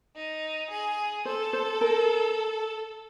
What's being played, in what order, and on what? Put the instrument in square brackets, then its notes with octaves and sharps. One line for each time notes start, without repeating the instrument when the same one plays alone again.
[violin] D#4
G#4
[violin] A4 [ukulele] C5
[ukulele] C5
A#4